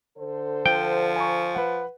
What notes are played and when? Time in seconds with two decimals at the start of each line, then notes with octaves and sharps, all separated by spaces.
0.17 D3 A4 C5
0.66 F3 G5
1.16 G#5 A#5 C#6
1.55 B4 F#5